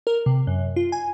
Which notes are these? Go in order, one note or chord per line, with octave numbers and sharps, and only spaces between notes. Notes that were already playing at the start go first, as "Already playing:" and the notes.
A#4
C3
F#2
F4
G#5